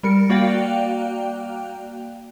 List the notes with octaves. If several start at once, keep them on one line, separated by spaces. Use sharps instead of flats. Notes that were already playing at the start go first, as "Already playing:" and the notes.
G3 A#4 C#7
A#3 F#4 D5 F5 G5